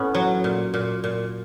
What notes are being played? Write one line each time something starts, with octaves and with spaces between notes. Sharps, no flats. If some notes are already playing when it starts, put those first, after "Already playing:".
Already playing: A2 B3 C#4
F#3
A#2
A#2
A#2